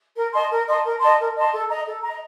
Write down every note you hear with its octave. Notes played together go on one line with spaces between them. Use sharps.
A#4
D#5 A5 C6
A#4
D#5 A5 C6
A#4
D#5 A5 C6
A#4
D#5 A5 C6
A4
D#5 A#5
A4
D#5 A#5